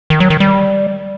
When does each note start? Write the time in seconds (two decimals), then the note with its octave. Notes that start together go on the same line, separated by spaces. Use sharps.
0.10 D#3
0.20 F#3
0.30 D#3
0.40 G3